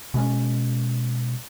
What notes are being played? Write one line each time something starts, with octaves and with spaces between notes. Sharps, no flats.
B2 G#3 C#4